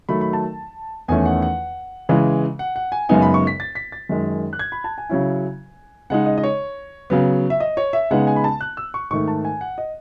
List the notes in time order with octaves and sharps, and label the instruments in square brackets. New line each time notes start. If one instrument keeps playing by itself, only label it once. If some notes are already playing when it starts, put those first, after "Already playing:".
[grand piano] D#3 F#3 A3 B5
B5
A5
E2 D#3 A3 C#4 E4 G#5
F#5
F#5
C#3 E3 G#3
F#5
F#5
G#5
F#2 C#3 G#3 B3 D#4 G#5
B5
C#6
B6
A6
B6
A6
F#2 D#3 G#3
F#6
G#6
B5
A5
G#5
C#3 F#3 C#4 E4
C#3 G#3 D#4 F#5
D#5
D#5
C#5
C#3 F#3 B3
E5
D#5
C#5
E5
C#3 G#3 B3 D#4 F#5
G#5
B5
A5
F#6
E6
C#6
G#2 D#3 A3 C#6
A5
G#5
F#5
D#5